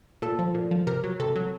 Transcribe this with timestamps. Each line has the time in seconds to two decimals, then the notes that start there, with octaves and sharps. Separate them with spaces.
0.22 A#2 A4
0.39 F3
0.54 A#2
0.71 F3
0.87 C3 A#4
1.04 F#3
1.20 C3 A4
1.36 F#3